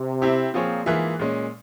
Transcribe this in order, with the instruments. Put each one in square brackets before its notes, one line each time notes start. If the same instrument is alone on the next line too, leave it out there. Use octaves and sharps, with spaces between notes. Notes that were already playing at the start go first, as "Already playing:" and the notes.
Already playing: [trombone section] C3
[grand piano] C4 E4 G4
[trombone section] A#2 [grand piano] F3 C4 F4 G#4 C#5
[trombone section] G#2 [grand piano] E3 A#3 F4 G#4 E5
[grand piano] A#2 G#3 C#4